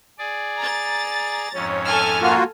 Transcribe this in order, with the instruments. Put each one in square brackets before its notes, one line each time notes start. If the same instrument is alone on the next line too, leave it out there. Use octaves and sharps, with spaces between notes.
[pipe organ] G#4 D5
[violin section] A#5 A6
[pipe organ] F2 G#2 C#4 [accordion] C#5
[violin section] A4 G#5 F6
[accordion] A#3 F4 F#4